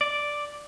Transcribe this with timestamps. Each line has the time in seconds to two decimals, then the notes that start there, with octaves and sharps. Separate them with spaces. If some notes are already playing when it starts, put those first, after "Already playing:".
0.01 D5